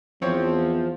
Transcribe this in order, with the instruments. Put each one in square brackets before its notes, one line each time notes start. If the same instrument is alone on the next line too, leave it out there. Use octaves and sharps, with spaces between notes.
[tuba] E2 [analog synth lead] F3 [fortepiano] C4 C#5